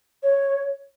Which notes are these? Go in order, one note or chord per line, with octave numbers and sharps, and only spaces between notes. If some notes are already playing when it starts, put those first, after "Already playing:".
C#5